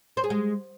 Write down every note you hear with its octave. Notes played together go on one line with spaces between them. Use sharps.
C5
G#4
G#3